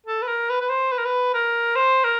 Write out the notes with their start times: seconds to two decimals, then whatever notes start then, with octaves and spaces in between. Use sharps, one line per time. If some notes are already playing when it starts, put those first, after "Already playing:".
0.06 A4
0.22 B4
0.27 A#4
0.49 B4
0.61 B4
0.69 C5
0.92 B4
0.98 A#4
1.05 B4
1.34 A#4
1.76 C5
2.04 A#4